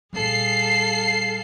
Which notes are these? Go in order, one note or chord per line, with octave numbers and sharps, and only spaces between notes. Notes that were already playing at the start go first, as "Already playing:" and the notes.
A#2 G3 G#4 A4 F5 C7